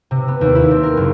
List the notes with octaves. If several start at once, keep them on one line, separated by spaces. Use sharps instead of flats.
C3
B3
D#2
E4
C4
A#4
F#1